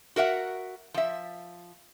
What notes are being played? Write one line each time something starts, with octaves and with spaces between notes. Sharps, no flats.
F#4 A#4 E5 F#5
F3 E5